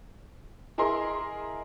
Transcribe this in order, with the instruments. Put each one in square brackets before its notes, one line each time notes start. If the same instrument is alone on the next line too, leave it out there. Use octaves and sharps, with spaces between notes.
[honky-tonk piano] E4 G#4 A#4 D#5 C6